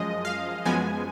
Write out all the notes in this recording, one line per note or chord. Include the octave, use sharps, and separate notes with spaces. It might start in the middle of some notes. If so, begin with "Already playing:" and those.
Already playing: F#2 F3 G#3 D#5
F5
F#2 F3 G#3 B3 G#5